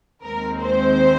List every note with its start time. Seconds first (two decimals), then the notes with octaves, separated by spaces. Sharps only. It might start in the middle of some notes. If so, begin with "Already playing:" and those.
0.22 D#2 D#3 G#3 C4 A#4
0.59 C5